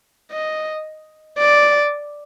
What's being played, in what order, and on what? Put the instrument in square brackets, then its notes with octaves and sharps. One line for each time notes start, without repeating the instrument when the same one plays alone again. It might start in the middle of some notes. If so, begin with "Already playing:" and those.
[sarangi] D#5
D5